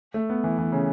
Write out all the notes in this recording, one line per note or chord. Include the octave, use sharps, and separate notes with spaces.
A3
B3
E3
E3
C#3